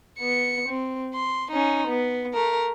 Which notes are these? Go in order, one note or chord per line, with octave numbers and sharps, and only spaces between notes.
B3 C#7
C4
C6
C#4 D#4
B3
A3 A#4